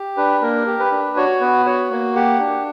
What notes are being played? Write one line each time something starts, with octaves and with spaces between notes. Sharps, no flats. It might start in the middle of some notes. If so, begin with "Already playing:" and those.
Already playing: G4
D4 B4
A#3 A#4
G4
B4
D4
F#4 C#5
B3 B4
F#4 C#5
A#3
G4 F#5
D4